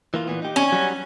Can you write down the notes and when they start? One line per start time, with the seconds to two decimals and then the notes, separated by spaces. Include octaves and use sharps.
0.14 E3 A#3 F4
0.27 A#2 E3 B3
0.42 D#4 G4
0.56 C#4
0.72 F#3 G3 F#4